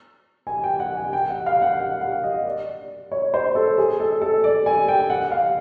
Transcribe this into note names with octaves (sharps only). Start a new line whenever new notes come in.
G#5
G5
F#5
G#5
G5
F#5
F5
F#5
F#5
F#5
D#5
D5
C#5
C5
A4
G#4
A4
A4
D5
G#5
G5
F#5
F5